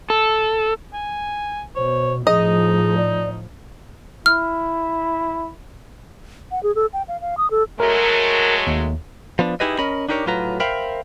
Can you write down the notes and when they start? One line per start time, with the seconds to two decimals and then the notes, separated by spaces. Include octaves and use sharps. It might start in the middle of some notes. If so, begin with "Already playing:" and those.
0.10 A4
0.93 G#5
1.75 B2 C5 C#5
2.27 A2 F3 D#4 G#4 D#5
2.97 D5
4.26 E4 F6
6.51 F#5
6.63 G#4
6.75 A4
6.93 G5
7.08 F5
7.21 F5
7.38 D#6
7.51 A4
7.80 F#3 G#3 A3 A#4
8.67 D#2
9.39 F3 B3 D4
9.60 D#4 E4 G4 G#4 B4 D#5
9.78 C#4 A#4 D#5 B5
10.09 D4 D#4 G4 A#4 C#5
10.26 A2 F#3 F4 B4 A#5
10.60 A#4 C5 E5 F5 G5 B5